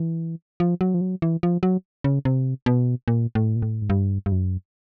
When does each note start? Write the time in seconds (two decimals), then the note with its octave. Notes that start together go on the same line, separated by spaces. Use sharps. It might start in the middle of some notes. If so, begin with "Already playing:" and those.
Already playing: E3
0.60 F3
0.81 F#3
0.94 F3
1.01 F#3
1.22 E3
1.43 F3
1.63 F#3
2.04 C#3
2.25 C3
2.66 B2
3.08 A#2
3.35 A2
3.56 A#2
3.62 A2
3.82 G#2
3.90 G2
4.26 G2
4.32 F#2